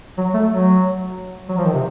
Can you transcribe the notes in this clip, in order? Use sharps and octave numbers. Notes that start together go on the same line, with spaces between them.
F#3
A3
F#3
F#3
F3
D#3
C3